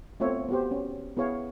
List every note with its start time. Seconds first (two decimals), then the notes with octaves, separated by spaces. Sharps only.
0.20 A3 B3 C4 F4 C#5 E5
0.49 B3 F#4 G4 C5
0.71 C#4
1.17 B3 E4 G#4 C#5 F5